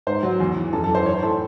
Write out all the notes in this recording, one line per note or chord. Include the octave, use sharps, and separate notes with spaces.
G#2 C5
F#3
E2
E3
F#2 A4
A4
E3
C5
E3 C#5
C5
A2 A4